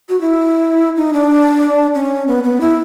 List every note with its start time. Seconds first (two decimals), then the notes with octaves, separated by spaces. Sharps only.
0.09 F#4
0.21 E4
0.96 D#4
1.13 D4
1.95 C#4
2.28 B3
2.44 B3
2.61 E4